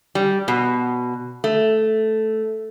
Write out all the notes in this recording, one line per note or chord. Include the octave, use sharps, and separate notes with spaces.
G3
B2
A3